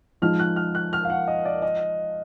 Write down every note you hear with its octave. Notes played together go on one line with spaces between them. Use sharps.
F3 G#3 D#4 F6
F#6
F6
F#6
F6
F5
F#5
D#5
D5
D#5